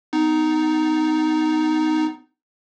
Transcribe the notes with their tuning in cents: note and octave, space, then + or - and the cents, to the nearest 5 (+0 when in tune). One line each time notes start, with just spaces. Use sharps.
B3 +35 D#4 +0